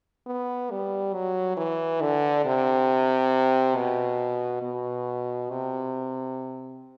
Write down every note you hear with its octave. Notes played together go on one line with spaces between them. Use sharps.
B3
G3
F#3
E3
D3
C3
B2
B2
C3